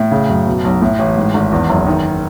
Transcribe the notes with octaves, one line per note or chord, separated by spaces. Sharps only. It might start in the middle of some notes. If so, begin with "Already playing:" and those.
Already playing: A2
C#3
F#2
B2
B1
A2
A1
G#2
G#1
E2
F#1
D#3